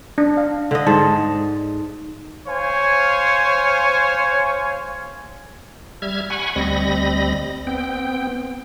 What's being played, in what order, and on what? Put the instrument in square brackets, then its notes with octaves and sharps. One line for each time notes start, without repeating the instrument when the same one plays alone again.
[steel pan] D4
F5
[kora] D3 D#5
[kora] G#2 [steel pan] A5
[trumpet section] C5 C#5 F5 G#5
[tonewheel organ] G3 E5 F6 G#6
F#5 G#5 B5 C#6
D2 G3 C4 D#5 B5 A#6
B3 C4 G5